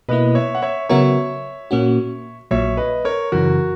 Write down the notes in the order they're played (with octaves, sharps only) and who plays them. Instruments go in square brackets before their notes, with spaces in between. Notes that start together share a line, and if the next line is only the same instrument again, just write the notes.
[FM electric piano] B2 A#3 E4 [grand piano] B4 D#5
[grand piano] C#5 E5
F#5
C#5 E5
[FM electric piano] C#3 F#3 B3 F#4 A#4 [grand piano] C#5 E5
[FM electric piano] A#2 A#3 C#4 F#4
[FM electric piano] A#1 A#2 F#3 [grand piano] C#5 E5
[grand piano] B4 D#5
A#4 C#5
[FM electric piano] F#2 C#3 E3 [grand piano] F#4 A#4